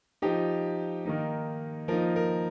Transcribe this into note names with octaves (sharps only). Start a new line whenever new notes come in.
F3 D#4 G4
D#3 A#3 D#4
F3 A#3 D#4 A#4
A#4